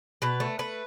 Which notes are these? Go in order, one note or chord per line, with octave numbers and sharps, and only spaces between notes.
B2 B4
A3
A3 B4